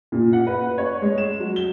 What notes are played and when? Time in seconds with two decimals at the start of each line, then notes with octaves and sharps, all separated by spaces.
0.12 A#2
0.33 F#5
0.47 B4
0.78 C#5
1.02 G#3
1.18 E7
1.40 F#3
1.56 G7